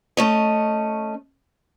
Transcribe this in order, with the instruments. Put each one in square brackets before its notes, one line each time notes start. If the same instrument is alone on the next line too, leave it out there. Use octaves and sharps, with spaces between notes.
[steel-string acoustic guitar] A3 C#4 D#5